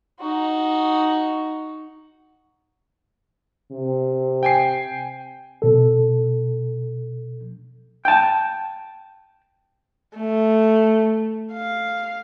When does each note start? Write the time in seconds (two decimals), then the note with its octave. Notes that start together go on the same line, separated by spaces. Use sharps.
0.20 D#4 F#4
3.72 C3
4.43 G5 G#5 C7
5.62 B2 A4
8.05 G5 A5
10.17 A3
11.53 F5